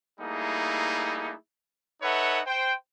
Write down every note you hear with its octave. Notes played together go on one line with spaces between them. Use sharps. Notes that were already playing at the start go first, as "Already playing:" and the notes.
G3 A3 A#3 D#4 E4 G#4
D#4 A4 B4 C#5 E5 F#5
C5 G5